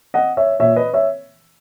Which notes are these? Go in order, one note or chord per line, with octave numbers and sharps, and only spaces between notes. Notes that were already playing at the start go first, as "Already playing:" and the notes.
D#5 F#5
C#5 E5
A#2 C#5 E5
B4 D#5
C#5 E5